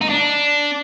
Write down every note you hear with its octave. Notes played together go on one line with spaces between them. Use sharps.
D#4
D4